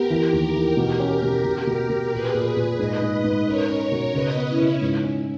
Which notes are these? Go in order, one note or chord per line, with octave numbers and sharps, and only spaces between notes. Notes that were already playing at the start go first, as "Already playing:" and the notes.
Already playing: B3 G4 A#4
E3
D#2
E3
B2 G4 A#4
C#4
B2
B2
B2
B2
A#2 G#4 B4
A#2
A#2
G#2 B4 D#5
G#2
B4 D#5
G#2
C#4 A#4 C#5
C#4
B2
C#3 B4 D#5
B3
C#4 E4
C#3
G#2
C#4